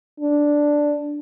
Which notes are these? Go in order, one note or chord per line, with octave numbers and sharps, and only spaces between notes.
D4